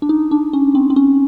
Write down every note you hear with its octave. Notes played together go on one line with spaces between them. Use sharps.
D4
D#4
D4
C#4
C4
C4
C#4